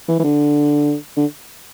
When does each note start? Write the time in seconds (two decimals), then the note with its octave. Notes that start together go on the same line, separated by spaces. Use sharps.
0.08 E3
0.19 E3
0.24 D3
1.17 D3